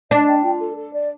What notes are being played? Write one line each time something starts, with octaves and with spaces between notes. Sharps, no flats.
D4 D#5
G5
F4
A4
A4
D5